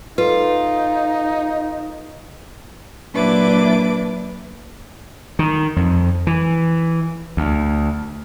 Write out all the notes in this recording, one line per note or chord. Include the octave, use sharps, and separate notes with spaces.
D#4 F4 A4 B4
A#2 F#3 D4 E4 B4 D6
D#3
F2
E3
D2